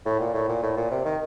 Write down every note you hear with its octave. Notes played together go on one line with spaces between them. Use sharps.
A2
A#2
A2
A#2
A2
A#2
C3
D#3